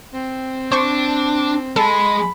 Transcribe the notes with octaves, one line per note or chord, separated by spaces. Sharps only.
C4
D4 C5 C#6
G#3 A4 B5